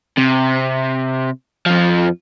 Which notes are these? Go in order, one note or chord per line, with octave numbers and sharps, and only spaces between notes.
C3
F2 F3